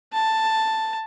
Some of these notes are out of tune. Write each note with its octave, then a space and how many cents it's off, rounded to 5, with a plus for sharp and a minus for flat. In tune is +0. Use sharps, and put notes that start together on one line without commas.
A5 +5